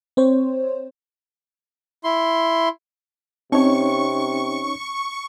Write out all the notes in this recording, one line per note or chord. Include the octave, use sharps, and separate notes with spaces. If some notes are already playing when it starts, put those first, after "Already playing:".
C4 C5 C#5
E4 C6
C3 C4 C#4 D#4 C#5 C#6